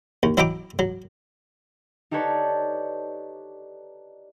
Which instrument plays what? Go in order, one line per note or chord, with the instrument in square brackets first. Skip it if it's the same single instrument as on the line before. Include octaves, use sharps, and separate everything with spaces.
[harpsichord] D#2
F#3 E4 D#5 G5 A#5 D6
F#3
[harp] D#4 G4 A4 B4 C#5 D5